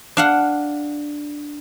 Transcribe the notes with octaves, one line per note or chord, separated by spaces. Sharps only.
D4 F5 F#5